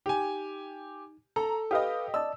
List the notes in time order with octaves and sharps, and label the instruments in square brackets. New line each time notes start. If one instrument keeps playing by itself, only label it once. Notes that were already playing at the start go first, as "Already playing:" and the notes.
[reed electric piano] D#4 [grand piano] G4 G#5
[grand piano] A4 [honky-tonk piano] A#5
[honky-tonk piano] G4 D#5 [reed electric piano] B4 F5 D#6
[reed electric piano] D5 D#5 A5 [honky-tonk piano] E6